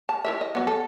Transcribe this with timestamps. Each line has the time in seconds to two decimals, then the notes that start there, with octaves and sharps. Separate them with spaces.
0.09 A5
0.25 E4 A#4 E5
0.41 D#5
0.55 F#3 B3
0.67 A4